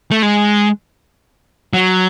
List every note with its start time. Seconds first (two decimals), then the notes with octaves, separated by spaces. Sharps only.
0.11 A3
0.22 G#3
1.73 F#3